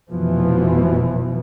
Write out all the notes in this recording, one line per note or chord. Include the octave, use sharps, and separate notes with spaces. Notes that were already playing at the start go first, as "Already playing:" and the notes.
F1 B2 E3 F3